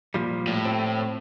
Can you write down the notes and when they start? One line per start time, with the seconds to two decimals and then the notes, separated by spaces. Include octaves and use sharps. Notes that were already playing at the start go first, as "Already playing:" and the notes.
0.14 A#2 F3 G3
0.47 A2
0.65 C4